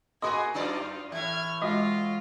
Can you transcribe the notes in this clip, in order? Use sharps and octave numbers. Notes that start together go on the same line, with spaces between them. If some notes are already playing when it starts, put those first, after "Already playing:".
A#3 F#4 G#4 D#5 G#5 B5 C6 D#6
F#2 D#4 F4 D5
A2 E3 F6 G#6
G#3 F4 F#4 D#5